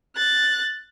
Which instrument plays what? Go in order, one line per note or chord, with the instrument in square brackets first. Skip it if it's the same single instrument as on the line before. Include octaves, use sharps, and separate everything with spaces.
[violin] F#6 A6